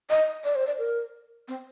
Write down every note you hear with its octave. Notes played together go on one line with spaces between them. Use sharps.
D#5
D5
C5
D5
A#4
C4